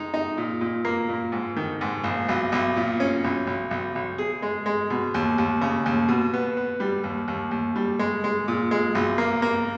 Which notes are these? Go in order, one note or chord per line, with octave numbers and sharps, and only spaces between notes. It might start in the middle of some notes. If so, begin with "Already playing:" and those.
Already playing: G#3 D#4
D#4
A#2
A#2
A#3
A#2
G#2
D#3
G#2
A#1
B1
B1
A#2
C#4
B1
B1
B1
B1
G#4
G#3
G#3
B2
D#2
D#2
C#3
D#2
B2
B3
B3
G3
D#2
D#2
D#2
G3
G#3
G#3
A#2
G#3
B1
A#3
A#3